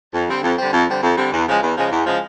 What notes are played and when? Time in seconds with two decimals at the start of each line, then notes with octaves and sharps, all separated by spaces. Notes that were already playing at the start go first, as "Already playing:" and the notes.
0.14 F2
0.29 D3 G3 C4
0.43 F2
0.59 D3 G3 C4
0.73 F2
0.87 D3 G3 C4
1.03 F2
1.17 D3 G3 C4
1.33 E2
1.48 C#3 F3 G#3
1.62 E2
1.77 C#3 F3 G#3
1.92 E2
2.07 C#3 F3 G#3